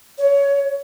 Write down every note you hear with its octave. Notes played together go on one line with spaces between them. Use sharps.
C#5